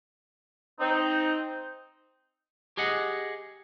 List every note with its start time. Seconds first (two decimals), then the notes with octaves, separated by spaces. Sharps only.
0.80 C4 D#4
2.77 G4 G#4 D#5 F#5